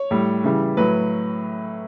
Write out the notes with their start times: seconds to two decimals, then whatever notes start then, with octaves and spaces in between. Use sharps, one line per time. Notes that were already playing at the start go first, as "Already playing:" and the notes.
Already playing: C#5
0.11 A2 G3
0.44 C#3 E3 G3
0.77 A2 F#3 B4